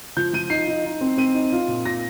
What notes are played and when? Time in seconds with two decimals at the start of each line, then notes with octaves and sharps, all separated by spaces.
0.17 F3 G6
0.33 F3 D#7
0.50 D#4 C7
0.68 D#4
0.85 D#4
1.01 C4
1.18 C4 D#7
1.34 D#4
1.52 F4
1.68 A#2
1.86 A#2 A#6